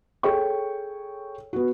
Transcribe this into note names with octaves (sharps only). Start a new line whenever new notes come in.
G#4 A4 C#5 G5 C#6
B3 F#4